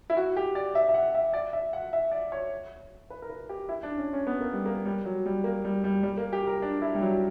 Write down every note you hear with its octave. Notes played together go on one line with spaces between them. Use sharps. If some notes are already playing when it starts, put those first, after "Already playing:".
E4
F#4
G4
D5
E5
E5
F#5
E5
D5
E5
F#5
E5
D5
C#5
B4
A#4
B4
G4
E4
D4
C#4
C#4
B3
A#3
G3
A#3
G3
F#3
G3
A#3
G3
G3
G3
A#3
G4
A#4
D4
E4
G3
F#3